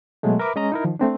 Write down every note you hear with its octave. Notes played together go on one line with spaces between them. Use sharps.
B2 F#3 G#3 A3
A#4 B4 E5 B5 D6
G#3 C#4 D#5 A#5
D#4 E4 A#4
D#3 F3
A3 C4 D4